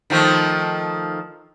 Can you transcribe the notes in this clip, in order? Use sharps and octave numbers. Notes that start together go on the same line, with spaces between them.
D#3 F3 A3